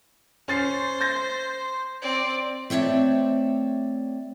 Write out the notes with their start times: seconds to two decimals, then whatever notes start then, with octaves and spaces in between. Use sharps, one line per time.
0.48 C#4 C5 A6 C7
1.01 G6 A6 A#6
2.02 C4 D5
2.70 A3 C4 C#5 D5 E5